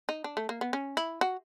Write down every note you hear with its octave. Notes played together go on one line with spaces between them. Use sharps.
D#4
D4
A3
A#3
B3
C#4
E4
F#4